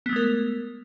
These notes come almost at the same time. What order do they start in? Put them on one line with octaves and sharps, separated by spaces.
B3 A3 G#3 A#4